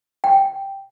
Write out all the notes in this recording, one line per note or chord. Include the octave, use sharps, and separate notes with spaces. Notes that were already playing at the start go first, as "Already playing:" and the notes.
G5